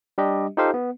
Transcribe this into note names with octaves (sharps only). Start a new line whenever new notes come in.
G3 D4 G4 D#5
D#4 F4 G4 A4 C5 F5
B3